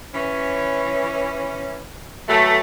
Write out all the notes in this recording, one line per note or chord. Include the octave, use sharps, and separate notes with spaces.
E3 C#4
E3 F#3 A3